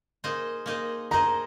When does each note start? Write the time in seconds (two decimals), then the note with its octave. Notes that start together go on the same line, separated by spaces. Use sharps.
0.24 A#3 D#4 G#4 C5 D#5
0.66 A#3 D#4 G#4 C5 D#5
1.11 A#3 D#4 G#4 C5 D#5 A#5